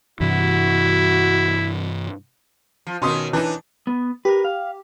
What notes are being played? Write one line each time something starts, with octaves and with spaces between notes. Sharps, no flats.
G2 C3 E3 E4 F#4
F3
B2 D#3 C#4 C6 D#6
E3 D4 D#4
B3
G4 A#4 B4
F5